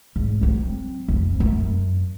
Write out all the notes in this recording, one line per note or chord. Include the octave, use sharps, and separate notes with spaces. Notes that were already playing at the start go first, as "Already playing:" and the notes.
G#1
F#3 C4
F2
F#2